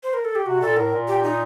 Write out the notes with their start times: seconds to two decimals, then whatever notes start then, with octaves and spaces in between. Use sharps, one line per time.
0.03 C5
0.14 A#4
0.25 A4
0.35 G4
0.46 C3 F#4
0.61 A#2 A4
0.77 A2 A#4
0.93 A#2
1.08 G4
1.23 D#4